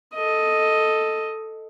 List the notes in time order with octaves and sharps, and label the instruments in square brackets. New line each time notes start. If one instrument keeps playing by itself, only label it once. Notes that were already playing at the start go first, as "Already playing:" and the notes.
[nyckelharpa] A4 D#5